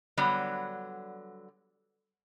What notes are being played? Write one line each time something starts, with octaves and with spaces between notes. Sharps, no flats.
D3 F#3 G3 B3